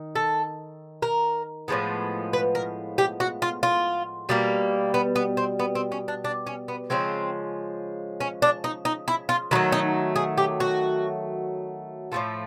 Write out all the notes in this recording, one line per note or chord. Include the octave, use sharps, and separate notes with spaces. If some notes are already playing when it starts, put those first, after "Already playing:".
Already playing: D#3
A4
A#4
A2 F3 G#3 B3
B4
A#4
G4
F#4
F4
F4
B2 G3 A#3
B3
B3
C4
B3
C4
C#4
D4
D4
C#4
B3
C#3 F3 G#3 C4
C#4
D4
D#4
D#4
E4
F4
D#3 F#3 A3 E4
D#4
G#4
G4
F#4
A2 F3 A3 F4